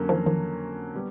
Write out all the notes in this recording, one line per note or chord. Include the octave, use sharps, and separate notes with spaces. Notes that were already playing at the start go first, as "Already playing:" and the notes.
Already playing: F2 D3 F#3 A#3 C#4
D#3 F3
D#3 F3
G3 B3